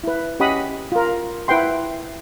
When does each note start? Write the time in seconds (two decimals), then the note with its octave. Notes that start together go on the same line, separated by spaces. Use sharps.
0.04 E4 B4
0.40 C#4 G4 D#5 F#5 B5 D#6
0.92 F4 A#4
1.48 E4 B4 F#5 G5 C6